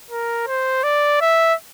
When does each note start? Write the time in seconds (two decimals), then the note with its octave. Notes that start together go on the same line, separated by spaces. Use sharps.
0.10 A#4
0.47 C5
0.83 D5
1.21 E5